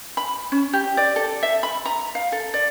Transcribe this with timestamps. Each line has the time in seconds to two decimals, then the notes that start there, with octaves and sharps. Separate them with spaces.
0.17 B5
0.52 C#4
0.73 G4
0.97 D5
1.16 A4
1.43 E5
1.63 B5
1.86 A#5
2.15 F5
2.32 A4
2.54 D5